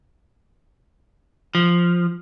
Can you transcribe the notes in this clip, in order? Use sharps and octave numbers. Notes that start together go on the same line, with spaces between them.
F3